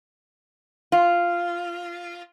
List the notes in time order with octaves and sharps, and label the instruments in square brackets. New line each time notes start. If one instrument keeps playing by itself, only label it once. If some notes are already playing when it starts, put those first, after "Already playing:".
[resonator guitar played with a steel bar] F4